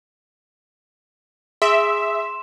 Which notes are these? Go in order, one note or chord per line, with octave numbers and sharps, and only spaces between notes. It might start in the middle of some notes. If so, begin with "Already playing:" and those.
G#4 E5 C6 E7